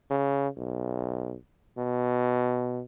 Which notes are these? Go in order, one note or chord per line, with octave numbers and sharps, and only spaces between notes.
C#3
B1
B2